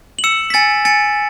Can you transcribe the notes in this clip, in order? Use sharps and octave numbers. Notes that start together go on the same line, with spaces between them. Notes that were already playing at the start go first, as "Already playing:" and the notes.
F#7
E6 C#7 E7
B6
G#5 A6 C#7
G#5 A6 C#7